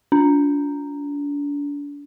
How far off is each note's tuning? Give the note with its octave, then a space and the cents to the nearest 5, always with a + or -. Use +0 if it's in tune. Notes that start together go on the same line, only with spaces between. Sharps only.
D4 -35